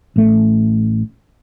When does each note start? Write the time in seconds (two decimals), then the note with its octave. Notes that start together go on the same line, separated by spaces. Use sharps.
0.16 A1 A3